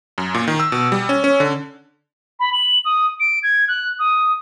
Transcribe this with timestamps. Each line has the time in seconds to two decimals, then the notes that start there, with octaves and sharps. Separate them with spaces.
0.18 F#2
0.34 A#2
0.48 D#3
0.60 E6
0.72 B2
0.92 G3
1.09 C#4
1.24 C#4
1.40 D3
2.39 B5
2.52 F#7
2.85 D#6
3.20 D7
3.43 G#6
3.68 F#6
3.99 D#6